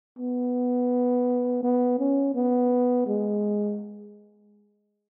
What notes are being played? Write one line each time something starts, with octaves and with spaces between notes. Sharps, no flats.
B3
B3
C#4
B3
G#3